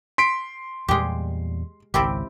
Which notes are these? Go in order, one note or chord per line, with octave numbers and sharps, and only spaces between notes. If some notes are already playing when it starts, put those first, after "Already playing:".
C6 B6 D7
E2 A#2 G3 G#3 G4
G#1 C#2 C4 E4 G4